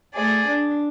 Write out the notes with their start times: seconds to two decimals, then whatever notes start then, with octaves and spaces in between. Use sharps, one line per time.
0.14 A3 G#4 D5
0.47 D4